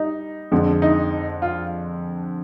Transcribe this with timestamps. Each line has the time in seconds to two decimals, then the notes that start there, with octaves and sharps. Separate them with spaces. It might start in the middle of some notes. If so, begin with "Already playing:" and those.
Already playing: G3 D#4
0.52 F2 D3 G#3
0.82 D#4
1.42 F4